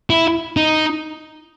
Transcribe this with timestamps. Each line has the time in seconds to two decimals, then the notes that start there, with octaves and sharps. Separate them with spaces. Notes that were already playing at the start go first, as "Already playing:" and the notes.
0.10 E4
0.57 D#4